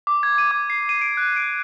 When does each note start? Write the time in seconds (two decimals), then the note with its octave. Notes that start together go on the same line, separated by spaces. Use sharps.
0.07 D6
0.23 G#6
0.38 D#7
0.51 D6
0.70 C7
0.89 D#7
1.01 D7
1.17 F#6
1.36 D7